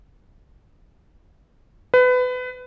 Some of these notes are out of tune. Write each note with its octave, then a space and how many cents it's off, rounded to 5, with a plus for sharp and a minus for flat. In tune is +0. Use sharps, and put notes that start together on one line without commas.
B4 +25